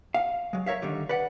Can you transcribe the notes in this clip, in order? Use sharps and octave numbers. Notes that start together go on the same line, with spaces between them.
F5
F#3 G#3
A#4 C#5 E5 F5
D3 D#3 G3
B4 D5 F#5